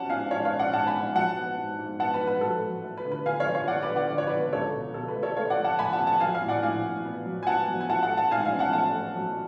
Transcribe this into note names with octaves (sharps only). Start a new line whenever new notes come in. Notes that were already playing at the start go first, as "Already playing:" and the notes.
Already playing: F#3 C#4 F#5 A5
G#2 F5 G#5
G#2 C#5 F5
C#5 F5
C#4
D5 F#5
G#2 F#5 A5
G#5 B5
G#2
F#3 F#5 A5
B3
G#2
G#2
B3 F#5 A5
B4
G#2
B4
F#3 A4
F#3
A3
B4
D3
B4
D3 F5 G#5
C#5 F5
D3
C#5 F5
D3 D5 F#5
B4 D5
D3
D5 F#5
D3 D5
C#5
D3 B4 D5
C#2 A4 C#5
B2
B2 A4
B4
A3
A4 C#5
A3 C#5 F5
D5 F#5
A3
F#5 A5
A3 G#5 B5
F#5 A5
C#2
F#5 A5
F#3 F5 G#5
F5 G#5
A2
D5 F#5
A2 F5 G#5
A2
B3
F#3
G#5
B3 F#5 A5
F#3
G#5
A3 F#5 A5
F#5 A5
A3
F#5 A5
G#2 F5 G#5
F5 G#5
C#4
F#5 A5
A3 F#5 A5
A3
F#3